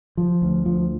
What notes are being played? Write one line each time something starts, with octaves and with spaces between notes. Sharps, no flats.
F3
D2
F3